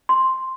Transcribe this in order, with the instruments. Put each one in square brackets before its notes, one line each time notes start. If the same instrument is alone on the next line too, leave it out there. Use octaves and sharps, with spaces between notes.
[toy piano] C6